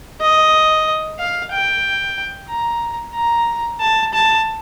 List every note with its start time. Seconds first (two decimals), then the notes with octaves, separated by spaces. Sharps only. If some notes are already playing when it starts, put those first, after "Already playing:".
0.21 D#5
1.19 F5
1.52 G5
2.49 A#5
3.15 A#5
3.81 A5
4.14 A5